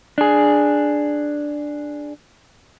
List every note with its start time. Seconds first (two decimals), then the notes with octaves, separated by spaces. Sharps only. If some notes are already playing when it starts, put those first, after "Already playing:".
0.18 D4 G#4